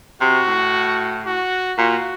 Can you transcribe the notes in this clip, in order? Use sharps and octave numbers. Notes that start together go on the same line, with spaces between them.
C3 F#4
A2
F#4
A#2 F#4